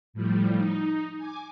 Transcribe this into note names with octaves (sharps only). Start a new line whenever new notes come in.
A2 F3 G3
D#4
G#5 D6